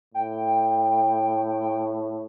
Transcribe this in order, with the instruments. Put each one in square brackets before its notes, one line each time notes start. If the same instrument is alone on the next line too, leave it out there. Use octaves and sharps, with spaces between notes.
[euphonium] A2 [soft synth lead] G5